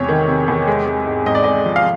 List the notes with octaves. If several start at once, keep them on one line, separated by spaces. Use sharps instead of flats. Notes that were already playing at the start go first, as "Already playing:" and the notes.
Already playing: E2 C3 G#3 C#5
D#3
C3
E2
G#3
G#3
G#2
G#2 D#5
D5
G#3 D#5
F3
F5